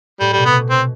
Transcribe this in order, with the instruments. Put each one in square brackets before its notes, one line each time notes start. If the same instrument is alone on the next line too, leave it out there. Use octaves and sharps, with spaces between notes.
[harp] A2 [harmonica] G3
[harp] B2 [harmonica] G3
[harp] C3 [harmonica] B3
[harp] B2
[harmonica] C4